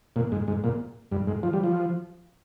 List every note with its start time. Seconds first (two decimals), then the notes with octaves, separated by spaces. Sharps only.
0.16 A#2
0.32 G#2
0.48 G#2
0.64 A#2
1.12 G2
1.27 G#2
1.43 F3
1.53 G3
1.64 F3